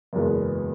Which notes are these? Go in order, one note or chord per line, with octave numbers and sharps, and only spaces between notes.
F#1 E2 B2 G#3 B3